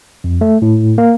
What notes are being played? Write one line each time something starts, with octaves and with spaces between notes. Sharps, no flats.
F2
A3
A2
A#3